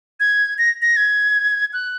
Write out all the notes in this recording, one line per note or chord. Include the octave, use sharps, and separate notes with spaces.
G#6
A#6
A#6
G#6
F#6